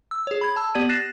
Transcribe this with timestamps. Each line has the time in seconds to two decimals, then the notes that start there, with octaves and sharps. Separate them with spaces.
0.11 E6
0.27 G#4 C#5
0.41 B5 G#6
0.56 A5 E6
0.75 B3 G4 D5 G#6 D#7
0.89 F#6 A6 A#6 C7 E7